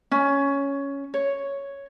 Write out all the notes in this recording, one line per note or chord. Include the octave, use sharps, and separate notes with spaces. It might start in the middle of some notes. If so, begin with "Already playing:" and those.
C#4
C#5